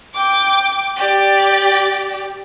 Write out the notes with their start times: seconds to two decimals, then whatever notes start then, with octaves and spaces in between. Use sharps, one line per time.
0.14 G5 D6
0.97 G4 D5